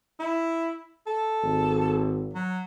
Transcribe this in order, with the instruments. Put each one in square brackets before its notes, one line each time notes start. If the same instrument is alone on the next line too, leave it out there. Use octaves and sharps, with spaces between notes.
[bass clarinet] E4
A4
[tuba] G#1
[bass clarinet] F#3